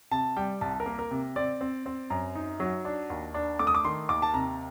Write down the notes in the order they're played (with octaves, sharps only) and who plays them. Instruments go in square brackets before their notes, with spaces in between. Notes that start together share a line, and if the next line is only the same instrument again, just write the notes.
[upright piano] C3 A5
G3 G5
C2 A5
A#4
A#3
A#4
C3
C4 D5
C4
C4
F#2 A#5
D#4
F#3
D4
D#2
D4
A3 D6
D#6
D6
D#3 C6
D#2 D6
A5
C3 A#5